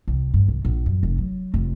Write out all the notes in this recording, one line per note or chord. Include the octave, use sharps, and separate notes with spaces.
C2
G2
C2
A#1
F#2
F1
F#3
F1